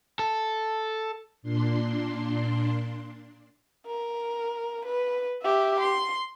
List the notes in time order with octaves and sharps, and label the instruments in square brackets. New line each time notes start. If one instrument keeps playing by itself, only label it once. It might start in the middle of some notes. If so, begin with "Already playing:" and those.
[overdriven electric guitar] A4
[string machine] A#2 D4 C6
[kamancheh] A#4
B4
G4 E5
C6